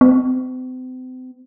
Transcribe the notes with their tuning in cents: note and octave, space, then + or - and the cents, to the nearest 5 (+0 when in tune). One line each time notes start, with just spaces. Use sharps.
C4 -40